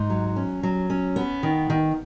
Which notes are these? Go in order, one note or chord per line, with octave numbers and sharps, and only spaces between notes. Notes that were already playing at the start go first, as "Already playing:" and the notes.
Already playing: G#2 D#4
F#3
C#4
F#3
C#4
B3
D#3
D#3